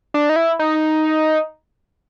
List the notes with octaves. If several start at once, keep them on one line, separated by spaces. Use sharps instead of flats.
D4
D#4
E4
D#4